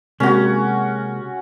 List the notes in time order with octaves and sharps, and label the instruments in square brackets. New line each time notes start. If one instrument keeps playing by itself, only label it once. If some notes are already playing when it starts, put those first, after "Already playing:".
[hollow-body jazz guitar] C3 G#3 A#3 [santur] C#4 F#4